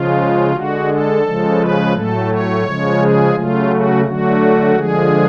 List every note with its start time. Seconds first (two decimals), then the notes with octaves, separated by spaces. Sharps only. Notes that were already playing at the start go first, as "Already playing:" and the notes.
Already playing: C#3 F3 G#3 F4
0.52 D3 G#3 F#4
0.88 A4
1.22 C#3 F3 G#3
1.58 B4
1.93 A2 F#3 A3 A4
2.29 C#5
2.64 C#3 F3 G#3
2.99 G#4
3.35 C#3 F#3 A3 F4
3.70 F#4
4.05 D3 F#3 A3 F#4
4.75 D3 F3 G#3 G#4